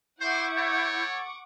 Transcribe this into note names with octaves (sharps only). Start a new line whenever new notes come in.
E4 C5 F#5 C#6 D6 G6
A4 C#5